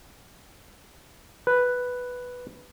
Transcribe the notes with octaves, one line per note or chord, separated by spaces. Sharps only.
B4